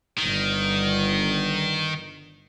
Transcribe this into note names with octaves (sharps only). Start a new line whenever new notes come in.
G1 D#3